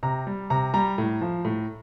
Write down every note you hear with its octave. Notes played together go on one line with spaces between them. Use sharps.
C3 A#5
G3
C3 A#5
G3 A#5
A2
F3
A2